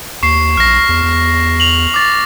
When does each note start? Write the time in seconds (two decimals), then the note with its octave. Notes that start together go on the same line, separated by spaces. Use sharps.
0.23 D#2 C#6 C7
0.57 A#1 F6 A#6
0.89 E2
1.03 E2
1.60 F7 F#7
1.94 D6 A6